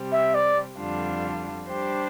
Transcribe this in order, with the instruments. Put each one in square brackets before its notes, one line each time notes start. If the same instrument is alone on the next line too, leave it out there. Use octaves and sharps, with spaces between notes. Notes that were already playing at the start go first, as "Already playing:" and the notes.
Already playing: [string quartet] C3 G3 C4 G4
[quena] E5
D5
[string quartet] F2 D3 G3 D4 F4
G3 D4 G4 C5